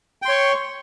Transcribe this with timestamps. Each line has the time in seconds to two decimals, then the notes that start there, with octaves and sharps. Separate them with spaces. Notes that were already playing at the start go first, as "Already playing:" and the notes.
0.22 G5
0.25 C6
0.28 C#5
0.31 C#6